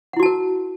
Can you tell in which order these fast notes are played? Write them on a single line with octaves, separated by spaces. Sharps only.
F#5 E4 F#4 A5 A#4